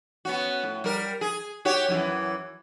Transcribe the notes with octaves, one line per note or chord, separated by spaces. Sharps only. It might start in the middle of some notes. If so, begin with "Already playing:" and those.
B3 C#4 F#4
A2
G3 A#4
G#4
F#4 G4 C#5
F#2 D#3 E3